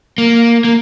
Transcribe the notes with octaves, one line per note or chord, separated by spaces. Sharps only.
A#3
A#3